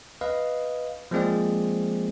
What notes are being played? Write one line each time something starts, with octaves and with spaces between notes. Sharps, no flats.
B4 D#5 F5
F3 G#3 A#3 C4 G#4 D5